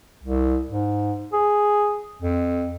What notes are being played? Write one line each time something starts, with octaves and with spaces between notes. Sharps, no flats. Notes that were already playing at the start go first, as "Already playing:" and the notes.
C2
G#2
G#4
F2